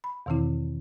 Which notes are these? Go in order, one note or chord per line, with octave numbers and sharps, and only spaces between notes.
B5
E2 B2 D#3 E3 C4 E4